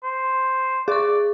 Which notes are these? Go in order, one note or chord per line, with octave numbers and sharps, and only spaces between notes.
C5
G#4 D5 C#6